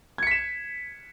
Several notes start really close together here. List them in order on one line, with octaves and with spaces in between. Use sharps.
G#6 C#7 B6 E7